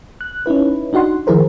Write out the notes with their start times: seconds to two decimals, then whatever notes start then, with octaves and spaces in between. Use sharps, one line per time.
0.21 F#6
0.46 C#4 D#4 E4 B4
0.93 D4 D#4 F#4 F#5 C6
1.27 D#3 F3 E4 G#4 A#4 C5